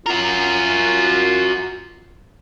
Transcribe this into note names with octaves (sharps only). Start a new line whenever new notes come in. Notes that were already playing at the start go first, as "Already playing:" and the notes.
F4 F#4 A#4